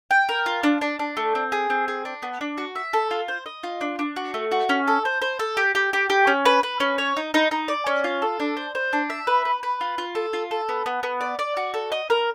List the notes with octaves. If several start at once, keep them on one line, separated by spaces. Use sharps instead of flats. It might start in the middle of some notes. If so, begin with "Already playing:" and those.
G5
A#4
F4
D4
D4
D4
A3
C4
G#4
C4
G#4
D4
B3
D4
F#4
E5
A4
F4
C5
D#5
F4
D4
D4
F#4
A3
F#4
C#4
A4
C5
C5
A4
G4
G4
G4
G4
C#4
B4
B4
C#4
C#5
D#4
D#4
D#4
D5
C#4
F4
A4
D4
C5
C5
D4
E5
B4
B4
B4
F4
F4
A4
F4
A4
B3
B3
B3
D5
D5
F#4
A4
D#5
A#4